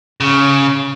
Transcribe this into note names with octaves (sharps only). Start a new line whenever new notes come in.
C#3